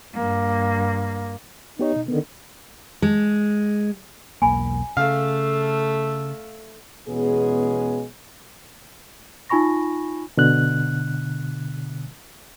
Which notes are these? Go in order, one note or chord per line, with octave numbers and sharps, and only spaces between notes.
G2 A#3
B3 D#4 G4 C#5
B2
D3 D#3 B3
G#3
E1 B1 A#3 G#5 B5
C#3 A3 A4 F5
E2 B2 G#3 B3 C#4 G#4
D#4 F4 G#5 B5 C#6 A#6
B2 D3 F#6